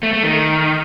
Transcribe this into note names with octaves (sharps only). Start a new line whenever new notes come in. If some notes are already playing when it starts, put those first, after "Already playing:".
A3
A3
D#3